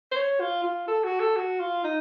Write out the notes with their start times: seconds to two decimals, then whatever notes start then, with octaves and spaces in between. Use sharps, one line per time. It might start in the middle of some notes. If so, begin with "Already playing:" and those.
0.12 C5
0.17 C#5
0.41 F4
0.64 F4
0.88 A4
1.04 F#4
1.20 A4
1.36 F#4
1.60 F4
1.84 D#4